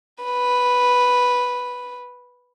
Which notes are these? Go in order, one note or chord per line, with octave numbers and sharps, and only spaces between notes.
B4